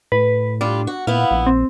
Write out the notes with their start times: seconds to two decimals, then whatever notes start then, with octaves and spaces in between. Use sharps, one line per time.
0.12 A2 B4
0.61 G3 D4 F4
0.87 F#4
1.07 A#2 B3 E4 F5
1.31 A#1
1.47 C4